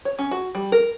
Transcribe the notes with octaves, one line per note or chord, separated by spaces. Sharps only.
C#5
C#4
F#4
G3
A#4